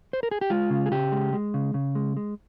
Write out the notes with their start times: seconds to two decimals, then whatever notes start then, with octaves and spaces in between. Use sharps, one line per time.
0.13 C5
0.23 A#4
0.31 G#4
0.41 G4
0.50 G#3 F4
0.70 C#3
0.86 G#4
0.92 C#3 G4
1.12 G#3
1.33 G#3
1.54 C#3
1.74 C#3
1.95 G#3
2.17 G#3